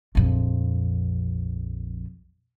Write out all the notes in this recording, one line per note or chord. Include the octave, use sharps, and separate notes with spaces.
A#1 F2